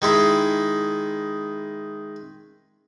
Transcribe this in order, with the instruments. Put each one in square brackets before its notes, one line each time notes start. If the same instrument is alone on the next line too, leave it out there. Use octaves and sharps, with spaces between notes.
[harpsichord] D#3 G#3 E4